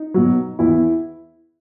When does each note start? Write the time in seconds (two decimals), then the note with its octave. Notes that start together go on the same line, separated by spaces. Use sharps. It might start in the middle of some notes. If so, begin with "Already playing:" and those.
Already playing: D#4
0.14 B2 F#3
0.59 E2 E4